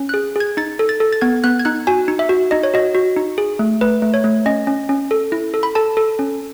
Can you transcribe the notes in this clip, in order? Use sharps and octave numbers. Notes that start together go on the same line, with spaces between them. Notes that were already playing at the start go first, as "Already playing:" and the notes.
Already playing: C#4
G#4 F#6
G#4 G#6
D#4 A6
A4
A6
A4
A6
B3 G#6
B3 F#6
G#6
D#4 F#6
F#4 G#5
D#4
E5
F#4
D#4 D#5
C#5
F#4 D#5
F#4
D#4
G#4
A3
A3 B4
A3
C#5
A3
C#4 D#5
C#4
C#4
A4
E4
A4
B5
A4 A5
A4
C#4